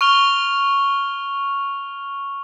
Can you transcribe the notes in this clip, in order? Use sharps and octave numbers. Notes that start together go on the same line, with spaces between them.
C#6 F6 F7 G7